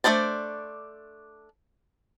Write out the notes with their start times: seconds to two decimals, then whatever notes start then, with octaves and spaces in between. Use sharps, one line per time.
0.04 A3 A#3 D4 C5 D5